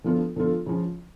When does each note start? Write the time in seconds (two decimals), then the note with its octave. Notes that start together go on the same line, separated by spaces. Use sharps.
0.04 D3 F3 B3 F4 A4
0.36 D3 F3 B3 F4 A4
0.66 C#3 F3